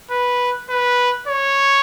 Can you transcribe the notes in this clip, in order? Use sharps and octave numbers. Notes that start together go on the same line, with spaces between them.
B4
B4
C#5